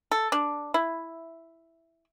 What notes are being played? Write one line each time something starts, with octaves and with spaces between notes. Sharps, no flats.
A4
D4
E4